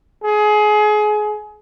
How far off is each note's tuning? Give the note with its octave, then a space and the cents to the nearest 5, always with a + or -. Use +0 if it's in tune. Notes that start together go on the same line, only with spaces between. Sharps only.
G#4 +25